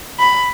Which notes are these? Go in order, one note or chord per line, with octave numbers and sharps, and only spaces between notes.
B5